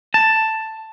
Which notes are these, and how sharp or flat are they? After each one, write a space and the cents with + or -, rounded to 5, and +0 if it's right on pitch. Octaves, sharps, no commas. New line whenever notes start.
A5 +5